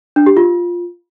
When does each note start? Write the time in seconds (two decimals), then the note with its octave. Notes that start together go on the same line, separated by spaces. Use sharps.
0.16 D4
0.26 G4
0.37 F4